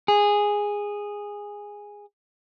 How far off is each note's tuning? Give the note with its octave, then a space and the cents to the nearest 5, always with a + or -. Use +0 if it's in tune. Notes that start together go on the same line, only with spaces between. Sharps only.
G#4 -10